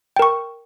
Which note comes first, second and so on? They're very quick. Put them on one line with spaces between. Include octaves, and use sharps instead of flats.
G5 A#4 C#6